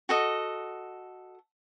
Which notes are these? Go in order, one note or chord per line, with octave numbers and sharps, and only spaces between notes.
F#4 A4 D#5